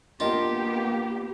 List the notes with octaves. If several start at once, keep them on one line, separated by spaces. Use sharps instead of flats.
A#3 B3 D4 F4 G4 A#4 D#5